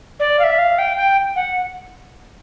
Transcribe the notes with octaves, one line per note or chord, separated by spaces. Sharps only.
D5
F5
E5
F5
G5
G5
F#5